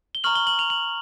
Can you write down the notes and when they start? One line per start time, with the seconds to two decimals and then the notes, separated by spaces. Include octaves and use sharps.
0.15 G7
0.24 A#5 C#6 F6 F#7
0.35 G7
0.47 F#7
0.59 F7
0.70 F#7